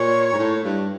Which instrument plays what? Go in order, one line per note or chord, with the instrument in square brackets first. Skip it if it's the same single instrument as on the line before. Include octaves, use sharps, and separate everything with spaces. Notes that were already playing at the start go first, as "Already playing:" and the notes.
Already playing: [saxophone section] A#2 [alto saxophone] C#5
[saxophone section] G#2
A2
G2